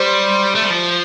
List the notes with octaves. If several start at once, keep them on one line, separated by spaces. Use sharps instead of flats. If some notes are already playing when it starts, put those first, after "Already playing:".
Already playing: G3 C5
A3
G3
F3